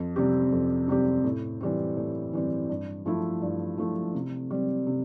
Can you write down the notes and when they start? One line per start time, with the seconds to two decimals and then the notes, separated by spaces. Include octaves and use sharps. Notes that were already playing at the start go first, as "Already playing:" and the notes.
Already playing: F2
0.16 C3 G3 C4 G4
0.52 F2
0.88 C3 G3 C4 G4
1.24 A2
1.61 E3 G3 C4
1.97 A2
2.33 E3 G3 C4
2.69 G2
3.06 F3 A3 E4
3.42 G2
3.78 F3 A3 E4
4.15 C3
4.51 G3 C4
4.87 C3